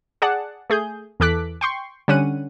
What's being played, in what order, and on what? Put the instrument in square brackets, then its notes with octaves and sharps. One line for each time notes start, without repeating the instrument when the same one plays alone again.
[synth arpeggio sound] G#4 D5 F#5 A5
A3 G#4 G6
E2 E3 A4 D6 F#6 B6
G5 C6 C#6
D3 G3 C#4 F#5 D#7